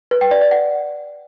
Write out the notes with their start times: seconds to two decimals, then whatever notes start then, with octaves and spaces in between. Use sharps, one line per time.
0.11 B4
0.21 G5
0.31 D5
0.41 D5
0.51 F#5